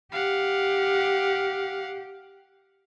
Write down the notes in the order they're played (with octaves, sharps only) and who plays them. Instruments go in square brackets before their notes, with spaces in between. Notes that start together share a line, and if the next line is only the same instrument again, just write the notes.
[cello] G4 [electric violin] F5 F#5